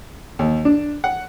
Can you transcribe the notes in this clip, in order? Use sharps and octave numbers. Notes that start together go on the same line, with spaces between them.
D#2
D4
F#5